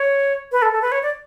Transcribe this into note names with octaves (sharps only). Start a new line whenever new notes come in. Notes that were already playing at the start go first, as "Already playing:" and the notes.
Already playing: C#5
B4
A4
A4
B4
C#5
D5